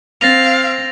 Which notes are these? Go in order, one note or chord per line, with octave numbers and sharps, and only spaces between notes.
C4 F5 A6 A#6 F7